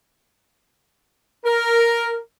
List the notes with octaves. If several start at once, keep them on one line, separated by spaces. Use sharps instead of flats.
A#4